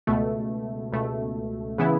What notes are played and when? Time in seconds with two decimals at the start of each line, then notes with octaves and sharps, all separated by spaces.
0.07 C#2 B2 A3
0.92 C#2 B2 A3
1.78 C#3 E3 B3 E4